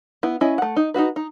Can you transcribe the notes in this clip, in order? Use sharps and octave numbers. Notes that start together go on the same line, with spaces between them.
B3 E4
C#4 E4 D#5
A3 F#5
D#4
D#4 F4 F#4 B4
D#4